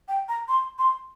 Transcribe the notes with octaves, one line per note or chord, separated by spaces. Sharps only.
G5
A#5
C6
C6